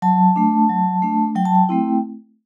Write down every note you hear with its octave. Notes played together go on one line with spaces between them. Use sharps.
F#3 A5
A3 D4
F#3
A3 D4
F#3 G5
A5
G5
A3 C4 E4